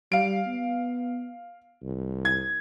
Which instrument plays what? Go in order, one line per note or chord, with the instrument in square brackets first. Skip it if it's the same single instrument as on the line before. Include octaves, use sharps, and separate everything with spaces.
[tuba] G3 [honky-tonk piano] F5 D7
[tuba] B3
C2
[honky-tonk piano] G#6